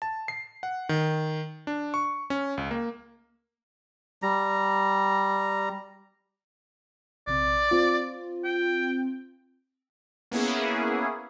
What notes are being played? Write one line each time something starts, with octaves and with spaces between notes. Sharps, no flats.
A5
C7
F#5
D#3
D4
C#6
C#4
C#2
A#3
G3 A#5
A#1 C3 D5
C4 F4
G5
A#3 B3 C#4 E4 G#4